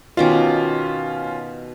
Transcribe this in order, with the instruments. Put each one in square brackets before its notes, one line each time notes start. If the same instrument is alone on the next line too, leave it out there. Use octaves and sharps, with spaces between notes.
[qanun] B2 D#3 D6 [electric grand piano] C#4 F4